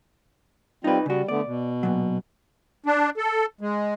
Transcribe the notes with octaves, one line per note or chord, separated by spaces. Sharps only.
G3 C4 D#4 F4 B4
C#3 G3 F#4
D3 A3 B3 D5
B2
A#2 F#3
D4
A4
G#3